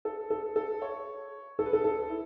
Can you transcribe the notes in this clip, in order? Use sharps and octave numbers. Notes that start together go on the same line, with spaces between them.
A4
A4
A4
C#5
A4
B4
A4
A4
E4